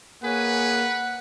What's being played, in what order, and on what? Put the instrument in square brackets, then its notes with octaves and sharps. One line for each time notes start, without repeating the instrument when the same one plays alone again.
[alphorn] A#3 [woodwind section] G#4 C#5 G#5 [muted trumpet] B4 [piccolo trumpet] F#5